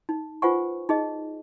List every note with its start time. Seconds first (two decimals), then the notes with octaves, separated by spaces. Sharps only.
0.09 D#4
0.42 F4 B4 C5 F#5 G#5 C#6
0.89 D#4 G#4 D#5